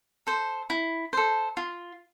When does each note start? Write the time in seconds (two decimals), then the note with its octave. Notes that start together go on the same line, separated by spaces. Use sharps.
0.27 A4 C5
0.70 E4
1.13 A4 C5
1.57 F4